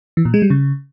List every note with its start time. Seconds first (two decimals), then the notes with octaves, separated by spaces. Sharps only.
0.17 E3
0.25 A#2
0.34 G#3
0.42 G3
0.50 C#3